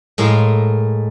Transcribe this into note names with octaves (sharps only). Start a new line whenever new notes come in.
A2 G#3 A#4 F5 C6